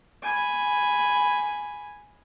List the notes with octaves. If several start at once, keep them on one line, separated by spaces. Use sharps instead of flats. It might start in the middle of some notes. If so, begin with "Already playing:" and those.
G#5 B5